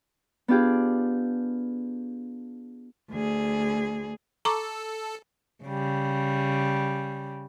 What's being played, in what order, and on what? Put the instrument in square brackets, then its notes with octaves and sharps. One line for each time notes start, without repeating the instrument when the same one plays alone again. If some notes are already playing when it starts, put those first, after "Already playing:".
[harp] B3 D4 F4 G4 G#4
[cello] D2 G#4
[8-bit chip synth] A4 [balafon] A#5 C#6 D6
[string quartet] C#3 G3